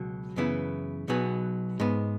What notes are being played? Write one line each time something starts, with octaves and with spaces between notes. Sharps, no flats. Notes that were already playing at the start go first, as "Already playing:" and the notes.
Already playing: C#2 B2 F#3
F#2 C#3 E3 B3 E4
B1 B2 F#3 B3 G#4
G#2 G#3 B3